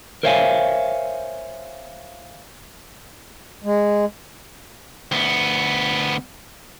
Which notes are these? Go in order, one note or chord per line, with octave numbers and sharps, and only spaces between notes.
A#4 C5 C#5 E5 F5 G#5
G#3
D2 B3